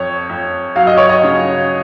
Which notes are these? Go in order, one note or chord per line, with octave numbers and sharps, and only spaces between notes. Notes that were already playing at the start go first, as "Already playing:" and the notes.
Already playing: F2 C#5
F2
F#3 F5
D#5
C#5
D#5
C#3